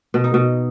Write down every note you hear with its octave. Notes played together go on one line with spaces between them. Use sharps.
B2
D#4
B2